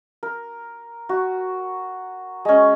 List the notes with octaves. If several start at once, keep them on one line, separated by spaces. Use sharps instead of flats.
A#4
F#4
G#3 C#4